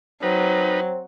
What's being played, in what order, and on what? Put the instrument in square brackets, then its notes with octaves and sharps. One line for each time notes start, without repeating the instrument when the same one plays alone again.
[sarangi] F#3 [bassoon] C4 [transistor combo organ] D#4 B4